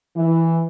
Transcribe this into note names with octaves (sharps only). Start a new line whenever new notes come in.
E3